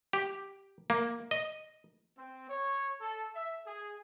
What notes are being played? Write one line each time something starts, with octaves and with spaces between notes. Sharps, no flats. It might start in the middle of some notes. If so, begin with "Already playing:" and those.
G4
A#3
D#5
C4
C#5
A4
E5
G#4